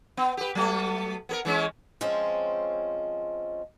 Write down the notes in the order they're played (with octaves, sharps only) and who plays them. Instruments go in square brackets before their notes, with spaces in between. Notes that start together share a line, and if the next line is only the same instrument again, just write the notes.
[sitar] B3
G4 B4
F#3 A3 B3
B3 G#4 A#4
E3 G#3 C#4
[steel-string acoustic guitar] F3 G#3 C4 C#4